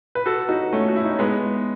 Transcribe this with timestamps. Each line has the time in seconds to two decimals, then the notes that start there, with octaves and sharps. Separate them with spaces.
0.15 B4
0.26 F#4 A4
0.49 D#4 F#4
0.73 A3 C#4
0.89 F#4
0.96 E4
1.05 D#4
1.11 C#4
1.19 G#3 B3